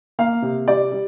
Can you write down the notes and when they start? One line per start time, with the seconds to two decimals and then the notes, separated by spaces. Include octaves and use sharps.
0.19 A#3 F5
0.42 C3
0.68 G3 D5
0.92 G3